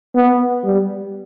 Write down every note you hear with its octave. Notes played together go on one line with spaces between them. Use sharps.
B3
G3